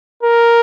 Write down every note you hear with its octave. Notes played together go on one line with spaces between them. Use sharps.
A#4